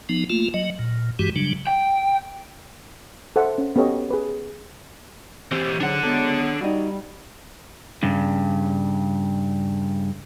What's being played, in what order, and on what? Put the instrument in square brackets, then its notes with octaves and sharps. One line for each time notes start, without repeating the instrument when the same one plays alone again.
[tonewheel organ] F3 B3 D#4
A3 A#3 F4
F#3 D#5
A#2
G2 E3 G#3 F#4 G4
C#3 F#3 G3 D4
[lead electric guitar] G5
[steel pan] A4 C5 E5 F#5
C#4
B3 C#4 G4 A4 C#5 D#5
G#4 B4
[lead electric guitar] E3 G4 [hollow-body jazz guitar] C4
[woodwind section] G#2 F#3 [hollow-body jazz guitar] D3 [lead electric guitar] D4 F#5
[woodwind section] F#3 B3 [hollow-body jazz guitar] G#3 A4
[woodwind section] G3 [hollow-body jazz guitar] D#4 F#4
[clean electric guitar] G2 C#3